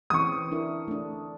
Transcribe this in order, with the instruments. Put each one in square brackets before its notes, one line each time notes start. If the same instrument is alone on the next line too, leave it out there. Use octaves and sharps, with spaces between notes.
[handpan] E3 C4 C#4 [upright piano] C#6 D#6
[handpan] D4 E4 A#4
A3 D4